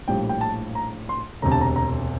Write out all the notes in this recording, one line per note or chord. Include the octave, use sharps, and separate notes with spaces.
A#1 A2 G3 A#3 G5
G5
A5
A#5
C6
E1 D2 C3 A#5
A5
A#5
A#5